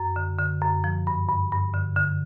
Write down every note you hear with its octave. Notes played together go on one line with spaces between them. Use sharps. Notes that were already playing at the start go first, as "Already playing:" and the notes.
Already playing: F#2
D3
D3
F#2
F3
G2
G2
G2
D3
D3